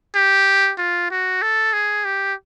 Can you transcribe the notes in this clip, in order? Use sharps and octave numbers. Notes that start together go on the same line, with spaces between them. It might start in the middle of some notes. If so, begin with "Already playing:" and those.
G4
F4
F#4
A4
G#4
G4